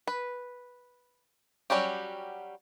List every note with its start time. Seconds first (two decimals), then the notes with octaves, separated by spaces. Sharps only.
0.07 B4
1.70 F#3 G3 C#4 F#4 G4